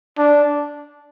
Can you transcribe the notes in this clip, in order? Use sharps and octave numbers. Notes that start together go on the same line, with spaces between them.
D4